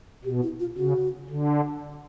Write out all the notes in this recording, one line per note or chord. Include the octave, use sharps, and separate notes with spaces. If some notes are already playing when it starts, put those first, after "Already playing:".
B2 G4
E4
F4
C#3 F#4
D3